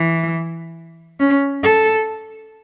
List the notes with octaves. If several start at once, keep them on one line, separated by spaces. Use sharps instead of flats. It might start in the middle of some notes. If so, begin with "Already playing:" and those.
Already playing: E3
C#4
A4